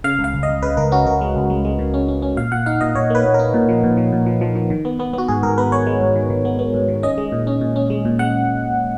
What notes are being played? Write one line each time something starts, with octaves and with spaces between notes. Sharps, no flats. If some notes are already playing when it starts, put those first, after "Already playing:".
C#3 F5
C#2
F5
C#2
D#5
C#2
C#3 B4
C#2 A#4
C#4 F#4
C#2 A#4
G#3
C#2
G#3
G#3
C#3
C#4
C#4
C#4
A#2 F5
A#2 F#5
D#4 F5
A#2 D#5
A#2 C#5
A#3 B4
A#2
A#4
D#4
A#2
F3
A#2
F3
A#2
F3
F3
F3
D#3
B3
B3
B3 F#4
G#2 G#4
G#2 A#4
B3 B4
B3 C#5
G#3
G#2
D#3
D#3
B3
B3
G#2
D#3
C#4 D#5
G#3
A#2
C#4
A#2
C#4
G#3
A#2
G#3 F#5